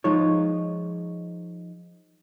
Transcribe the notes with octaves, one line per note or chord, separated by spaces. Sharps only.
F3 G#3 D#4 F4 C#5